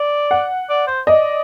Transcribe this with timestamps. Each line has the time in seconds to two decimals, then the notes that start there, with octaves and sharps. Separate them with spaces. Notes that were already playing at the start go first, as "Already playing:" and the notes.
Already playing: D5
0.31 F#5
0.69 D5
0.87 C5
1.07 D5 D#5